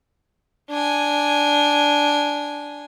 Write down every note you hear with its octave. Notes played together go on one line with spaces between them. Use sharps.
D4 G#5